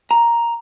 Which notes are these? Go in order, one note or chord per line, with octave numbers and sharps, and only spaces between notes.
A#5